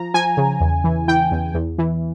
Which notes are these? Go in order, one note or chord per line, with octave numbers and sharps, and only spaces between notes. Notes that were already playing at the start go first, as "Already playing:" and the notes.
Already playing: F3 A#5
F3 G#5
C#3
E2
E3
E3 G5
E2
E2
E3